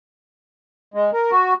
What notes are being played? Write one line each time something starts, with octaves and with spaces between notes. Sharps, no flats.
G#3
A#4
F#4